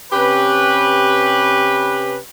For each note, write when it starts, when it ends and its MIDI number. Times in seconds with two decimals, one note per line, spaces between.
0.13 2.17 48
0.13 2.17 61
0.13 2.17 67
0.13 2.17 71